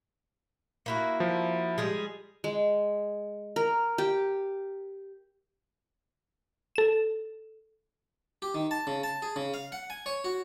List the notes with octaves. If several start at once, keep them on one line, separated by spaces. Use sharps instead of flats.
A#3 E4 F#4
F3
G3 G#3 G#4
G#3
A#4
G4
A4 E7
G4
D#3
A5
C#3
A5
G#4
C#3
F5
F#5
G#5
C#5
F#4